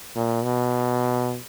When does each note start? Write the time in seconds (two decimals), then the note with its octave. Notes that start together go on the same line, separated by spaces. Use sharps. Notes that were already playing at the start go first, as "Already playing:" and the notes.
0.16 A#2
0.44 B2